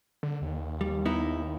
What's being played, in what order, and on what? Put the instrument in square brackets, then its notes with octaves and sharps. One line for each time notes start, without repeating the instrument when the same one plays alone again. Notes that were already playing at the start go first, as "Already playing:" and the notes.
[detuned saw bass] D3
D#2
[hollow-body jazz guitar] G3
B3 D#4 E4